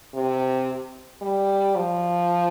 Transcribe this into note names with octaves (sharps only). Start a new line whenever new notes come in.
C3
G3
F3